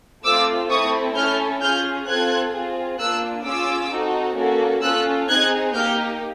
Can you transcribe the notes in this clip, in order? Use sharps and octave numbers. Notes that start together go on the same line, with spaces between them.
A3 C4 F4 D6 E6
A3 C4 E4 A4 C#6 D#6
C#4 E4 A4 F6 G6
C#4 F4 G#4 F6 G6
C4 F4 A4 F#6 G#6
C4 F4 G#4
A#3 D4 F4 E6 F#6
C#4 F4 G#4 D6 E6
C4 D#4 F#4 A4
A#3 C#4 F#4 A4
C#4 F4 A4 E6 F#6
C4 D#4 G#4 F#6 G#6
A#3 D#4 G4 F6 G6